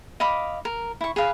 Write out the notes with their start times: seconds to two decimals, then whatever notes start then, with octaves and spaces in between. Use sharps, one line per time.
0.20 D#5 F5 B5 D6
0.65 A#4
1.01 E4 C#6
1.16 G#4 B4 F5